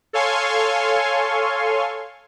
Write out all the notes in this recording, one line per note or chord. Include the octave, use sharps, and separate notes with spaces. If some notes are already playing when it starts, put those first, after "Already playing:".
A4 C#5 F5 G#5 C6 C#6